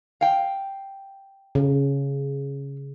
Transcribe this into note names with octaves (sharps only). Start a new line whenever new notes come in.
F5 G5
C#3